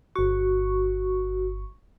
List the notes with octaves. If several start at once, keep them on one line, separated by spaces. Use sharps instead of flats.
G1 F#4 C#6